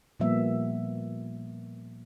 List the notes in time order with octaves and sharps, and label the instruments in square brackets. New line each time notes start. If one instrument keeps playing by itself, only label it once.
[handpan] A#2 F3 G3 A#3 B3 E5